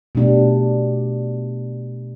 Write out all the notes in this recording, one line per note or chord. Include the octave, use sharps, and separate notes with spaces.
B2 A3 D4 G4